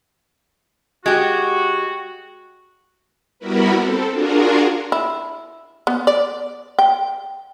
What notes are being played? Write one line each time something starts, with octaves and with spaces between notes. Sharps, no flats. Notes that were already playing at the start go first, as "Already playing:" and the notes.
G#3 F#4 G4
G3 B3 E4 F#4 A#4 B4
C4 A4
D4 F4 F#4 G#4 A#4
E4
B3
D5
G5